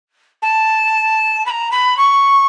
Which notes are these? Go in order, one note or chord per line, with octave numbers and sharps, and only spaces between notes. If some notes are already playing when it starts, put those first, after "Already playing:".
A5
B5
A#5
B5
C#6